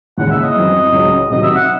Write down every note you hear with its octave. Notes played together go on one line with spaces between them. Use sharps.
D#2 C#3 E3 G#3 C#4 F#5
E5
D#5
F#2 E3 C4
C#2 C#3 F#3 C#4
C3 D#3 F#3 D#5
E5
F#5